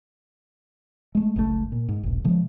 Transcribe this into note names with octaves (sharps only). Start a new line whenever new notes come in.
G#3 A3
F#1 C#2 C#3 A3
A#2
G#2
E1 A#1
C3 F3 G#3